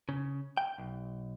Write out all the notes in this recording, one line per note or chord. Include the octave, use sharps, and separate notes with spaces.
C#3
G5
B1